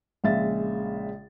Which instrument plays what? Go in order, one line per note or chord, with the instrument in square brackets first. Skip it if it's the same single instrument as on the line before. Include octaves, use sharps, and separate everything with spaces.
[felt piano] A#1 C#3 G#3 E5 F5 A6